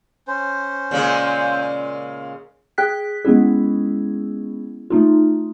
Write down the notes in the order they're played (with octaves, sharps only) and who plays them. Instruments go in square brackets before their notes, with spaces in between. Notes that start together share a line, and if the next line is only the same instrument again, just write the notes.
[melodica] C#4 C5
[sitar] A#2 C#3 G#3
[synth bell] G#4 G5 F#6 B6
G#3 B3 C#4 E4 G#4
A3 D#4 F4